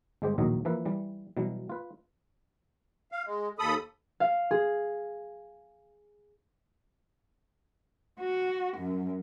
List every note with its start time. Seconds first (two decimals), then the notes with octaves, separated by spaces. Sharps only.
0.22 G1 G#3 G4 C5
0.38 A#1 D#2 A2 F#3 D#5
0.65 E3 F3 A#3 E4 B4
0.85 E3 G3
1.37 B2 E3 F#3 G3
1.69 F4 B4
3.12 F5
3.26 G#3
3.59 D#2 A4 B5 D#6
4.20 F5
4.51 G#4
8.20 F#4
8.77 F#2